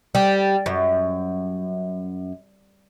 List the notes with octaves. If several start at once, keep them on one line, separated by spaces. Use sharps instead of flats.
G3
F#2